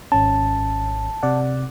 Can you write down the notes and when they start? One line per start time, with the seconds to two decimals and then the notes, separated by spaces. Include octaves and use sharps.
0.12 G#1 C#4 A5
1.23 C3 D5 F#5